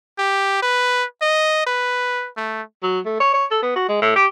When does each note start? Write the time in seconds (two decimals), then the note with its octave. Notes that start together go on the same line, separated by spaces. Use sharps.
0.18 G4
0.63 B4
1.22 D#5
1.67 B4
2.37 A3
2.83 F#3
3.06 A3
3.20 C#5
3.34 C#5
3.51 A4
3.63 B3
3.76 F#4
3.89 G#3
4.02 A2
4.16 G4